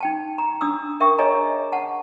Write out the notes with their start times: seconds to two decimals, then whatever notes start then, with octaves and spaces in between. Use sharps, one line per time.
0.01 D#4 G5 A5
0.38 A#5
0.61 D4 D#6 E6
1.00 A#4 E5 G5 C#6
1.18 G#4 C#5 D#5 G#5 A#5
1.72 F#5 A5